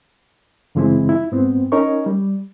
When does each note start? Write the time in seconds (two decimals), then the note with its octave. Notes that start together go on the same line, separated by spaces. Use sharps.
0.75 F#2 C#3 E3 G#3 C4 E4
1.09 E4
1.32 G#2 B3 C4
1.72 C#4 D#4 A#4 C#5 D#5 C#6
2.06 G3